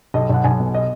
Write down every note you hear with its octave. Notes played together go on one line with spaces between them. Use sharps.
B1 D#5
B1 F#5
B1 G#5
B2
D#5